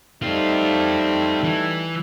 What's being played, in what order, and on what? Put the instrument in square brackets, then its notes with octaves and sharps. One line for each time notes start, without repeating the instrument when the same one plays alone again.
[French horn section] G3 A3 D#4 [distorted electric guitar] C4 F4
[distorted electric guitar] E3